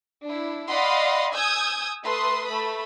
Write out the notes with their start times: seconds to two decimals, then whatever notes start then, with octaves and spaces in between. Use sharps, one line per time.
0.23 D4 E4
0.68 D5 D#5 F5 F#5 B5 C6
1.31 G#5 D#6 E6 G6 G#6
2.04 A3 B4 C6 D#6
2.47 A3 B5